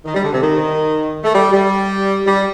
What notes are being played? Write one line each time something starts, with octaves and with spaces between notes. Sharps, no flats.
D#3
G3
D3
C3
D#3
A3
G3
G3
G3